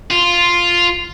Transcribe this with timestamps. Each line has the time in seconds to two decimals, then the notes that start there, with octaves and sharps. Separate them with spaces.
0.11 F4